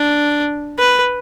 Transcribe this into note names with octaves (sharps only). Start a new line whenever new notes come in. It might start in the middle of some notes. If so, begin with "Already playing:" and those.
Already playing: D4
B4